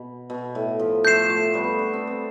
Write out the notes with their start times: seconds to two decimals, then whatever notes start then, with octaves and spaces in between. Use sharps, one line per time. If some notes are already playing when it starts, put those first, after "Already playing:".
Already playing: B2
0.30 B2
0.55 A2
0.79 F3
1.04 F3 A3 G6 C7 E7
1.29 F3 A3
1.54 G3 B3
1.79 D4
1.93 C4
2.07 B3